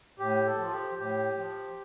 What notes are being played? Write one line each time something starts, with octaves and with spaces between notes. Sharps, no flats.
A2 G4
A4
F3
F4
G4
A2 G4
F3